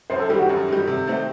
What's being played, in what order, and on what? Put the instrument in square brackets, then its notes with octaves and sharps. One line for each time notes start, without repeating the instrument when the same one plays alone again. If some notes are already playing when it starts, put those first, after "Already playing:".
[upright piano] F#2 [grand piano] C5
[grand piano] A4
[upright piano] D#3 G3 [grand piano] G4
[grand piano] F#4
[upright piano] F#2
D#3 G3
C3
D#3 A3 C4